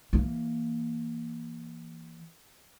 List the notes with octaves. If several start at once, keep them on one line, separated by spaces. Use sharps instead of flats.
E3 A#3